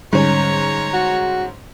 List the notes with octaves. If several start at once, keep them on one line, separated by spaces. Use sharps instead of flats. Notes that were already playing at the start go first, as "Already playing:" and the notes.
G#2 D3 G3 C#4 C#5 A#5
F#4